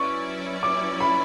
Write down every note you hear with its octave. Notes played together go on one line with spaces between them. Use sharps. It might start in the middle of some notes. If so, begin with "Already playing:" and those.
Already playing: F#3 C#4 E4 B4 D5 C#6
D6
B5